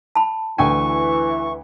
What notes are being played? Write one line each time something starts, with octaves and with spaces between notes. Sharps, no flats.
A5 B5
D2 E3 G5 G#5 C#6